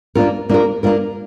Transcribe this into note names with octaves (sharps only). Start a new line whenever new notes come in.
A#3 D4 F4 A#4
A#3 D4 F4 A#4
A#3 D4 F4 A#4